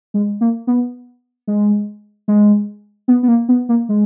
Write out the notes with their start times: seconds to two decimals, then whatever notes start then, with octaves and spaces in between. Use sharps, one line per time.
0.14 G#3
0.41 A#3
0.67 B3
1.47 G#3
2.28 G#3
3.08 B3
3.23 B3
3.28 A#3
3.49 B3
3.69 A#3
3.89 G#3